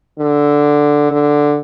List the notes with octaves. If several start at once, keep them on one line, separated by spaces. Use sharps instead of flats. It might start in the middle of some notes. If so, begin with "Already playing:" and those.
D3
D3